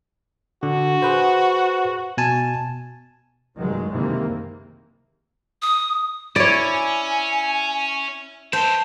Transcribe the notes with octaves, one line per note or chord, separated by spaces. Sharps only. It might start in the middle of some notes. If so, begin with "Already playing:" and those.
D3 F#4
G#4 B4 C5
B2 G#5 A5
F1 C#2 G2 D#3 F#3 G#3
F#1 C3 D#3 E3 A#3
D#6
C#4 E4 C#5 D5
G#5
E4 C5 G5 A5